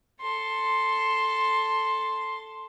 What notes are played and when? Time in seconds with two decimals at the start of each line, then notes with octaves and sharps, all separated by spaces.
0.21 A4 C6